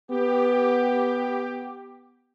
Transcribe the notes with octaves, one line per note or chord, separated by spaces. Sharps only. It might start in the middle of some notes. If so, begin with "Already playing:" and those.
B3 G4